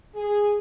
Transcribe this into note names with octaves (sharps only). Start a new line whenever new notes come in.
G#4